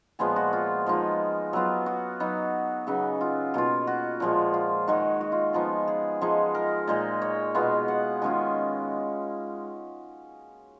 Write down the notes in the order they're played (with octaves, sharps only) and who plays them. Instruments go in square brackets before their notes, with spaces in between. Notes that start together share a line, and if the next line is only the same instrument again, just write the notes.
[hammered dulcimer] A#2 F3 G#3 B3 G#4
F#4
F4
F3 G#3 D#4
F#3 B3 F4
F#4
F#3 B3 D#4
C#3 F#3 B3 D#4
F4
B2 A#3 F4
F#4
A#2 F3 G#3
F4
D#3 G#3 D#4 F#4
F#4
F4
F3 B3 D#4 F4
G#4
F3 G#3 D#4 G#4
A#4
A#2 G#3 D#4
C#5
B2 G#3 B3 F4 F5
F#5
D#3 G#3 C#4 F4 G#5